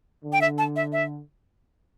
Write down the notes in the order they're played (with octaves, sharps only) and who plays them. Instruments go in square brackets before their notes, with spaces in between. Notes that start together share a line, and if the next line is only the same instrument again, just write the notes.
[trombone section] D3
[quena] G5
E5
A5
E5
E5